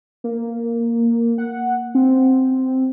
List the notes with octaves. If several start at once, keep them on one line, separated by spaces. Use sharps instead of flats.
A#3
F#5
C4